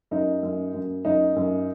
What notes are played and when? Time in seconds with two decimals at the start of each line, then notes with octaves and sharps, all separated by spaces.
0.11 F#2 D#4
0.43 F#2
0.74 F#2
1.05 F#2 D#4
1.36 F#2